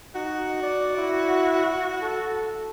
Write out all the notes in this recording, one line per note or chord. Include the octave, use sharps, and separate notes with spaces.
D#4 F#4
D5
E4
A4